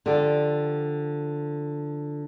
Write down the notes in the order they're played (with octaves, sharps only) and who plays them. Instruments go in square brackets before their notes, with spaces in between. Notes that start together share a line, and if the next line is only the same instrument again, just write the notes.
[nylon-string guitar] D3 F3 G4 A4